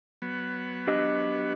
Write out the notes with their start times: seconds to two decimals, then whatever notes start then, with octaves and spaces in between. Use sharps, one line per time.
0.22 F#3 B3
0.87 D4 G4 D#5